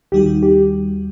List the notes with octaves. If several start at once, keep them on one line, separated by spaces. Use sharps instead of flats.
D#2 D#3 G3 D#4 F#4 G4
G4